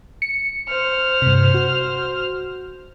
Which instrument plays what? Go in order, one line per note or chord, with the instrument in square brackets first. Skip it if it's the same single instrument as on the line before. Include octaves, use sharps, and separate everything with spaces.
[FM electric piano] C#7
[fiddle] C5 F6
[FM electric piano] G2 C3
F#4